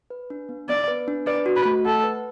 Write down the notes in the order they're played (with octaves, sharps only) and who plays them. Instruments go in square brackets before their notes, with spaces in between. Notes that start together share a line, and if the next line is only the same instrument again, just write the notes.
[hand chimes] B4
D4
B3
[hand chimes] B3 [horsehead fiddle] D5
[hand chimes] B4
D4
[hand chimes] B4 [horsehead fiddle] D5
[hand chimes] F#4
[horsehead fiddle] B4
[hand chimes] A3
[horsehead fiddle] A4 [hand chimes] F#5
[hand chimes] B4